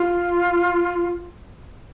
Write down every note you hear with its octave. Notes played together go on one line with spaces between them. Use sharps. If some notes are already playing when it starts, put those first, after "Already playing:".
Already playing: F4